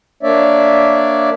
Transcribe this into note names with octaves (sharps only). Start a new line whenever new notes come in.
A#3 D4 C#5 D5 E5